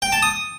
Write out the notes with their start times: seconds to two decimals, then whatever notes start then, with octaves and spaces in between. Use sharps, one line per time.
0.02 G5
0.12 A5
0.22 D#6